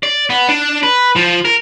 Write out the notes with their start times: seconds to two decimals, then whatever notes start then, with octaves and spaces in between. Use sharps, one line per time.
0.03 D5
0.30 B3
0.49 D4
0.83 B4
1.16 F3
1.45 A#4